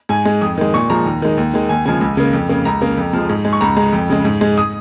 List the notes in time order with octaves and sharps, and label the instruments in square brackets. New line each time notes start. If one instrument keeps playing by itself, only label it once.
[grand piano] G#2 G#5
G#3
F2 D#6
D#3 G#3
A#2 C#6
F3 G#3 A#5
D#2
D#3 G#3
D#2
D#3 G#3
D#2 G#5
C#3 F3 G#3 G#5
C#2
C#3 A#3
F2
C#3 A#3
C#2 A#5
C#3 A#3
F2
F3 G#3
G#2
G#3
C#6
C#2 A#5
C#3 G#3 A#5
F2
C#3 G#3
G#2
G#3
D#6